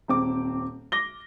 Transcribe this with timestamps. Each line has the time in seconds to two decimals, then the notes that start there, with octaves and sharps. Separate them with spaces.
0.08 D#1 C4 D6
0.92 D6 A#6 G7